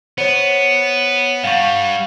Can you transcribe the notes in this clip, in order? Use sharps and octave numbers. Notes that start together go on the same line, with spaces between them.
B3 C5 C#5
G2 G3 F5 F#5 C#6